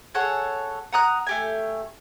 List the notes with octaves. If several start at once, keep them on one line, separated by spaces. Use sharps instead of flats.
G#4 A4 C#5 F#5
F#5 A#5 D#6 F#6
A3 G4 G#5